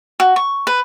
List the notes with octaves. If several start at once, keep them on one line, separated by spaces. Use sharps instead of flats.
F#4
C#6
B4